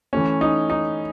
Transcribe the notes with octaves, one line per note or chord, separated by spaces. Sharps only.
E3 A3 C#4
D#4
D#4